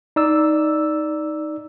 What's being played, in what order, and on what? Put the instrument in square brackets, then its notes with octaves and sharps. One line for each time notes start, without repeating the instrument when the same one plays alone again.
[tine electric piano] D#4 D5 E6